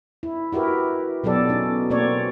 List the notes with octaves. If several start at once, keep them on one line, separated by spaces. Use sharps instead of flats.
E4
E4 F#4 G4 A#4 B4
B2 F#3 G4 A4 D5
C#4 D#4
B2 A#3 C4 C#5 D5